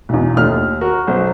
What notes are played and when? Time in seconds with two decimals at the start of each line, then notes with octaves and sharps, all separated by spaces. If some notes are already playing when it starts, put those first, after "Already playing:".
0.09 B1 E2
0.37 D#2 A3 D4 F4 F6
0.81 F#4 A#4
1.07 B1 B2 B3 C#4 C5